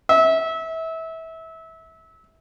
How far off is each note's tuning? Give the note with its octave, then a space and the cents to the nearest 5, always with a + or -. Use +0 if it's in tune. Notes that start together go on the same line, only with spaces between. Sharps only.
E5 -25